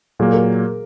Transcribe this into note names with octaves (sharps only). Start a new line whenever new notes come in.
A#2 F#3 A#3 G#4
A#4